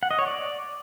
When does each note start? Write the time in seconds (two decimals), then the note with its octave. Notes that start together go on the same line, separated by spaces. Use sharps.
0.03 F#5
0.11 D#5
0.19 C#5
0.27 D5